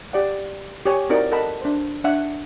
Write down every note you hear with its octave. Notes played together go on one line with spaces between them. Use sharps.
G4 D5 F#5
G4 C#5 G#5
C4 D#4 E4 F#4 A#4 D5
A4 A#4 D#5 F#5 A5 B5
D4 C5
D4 E5 F#5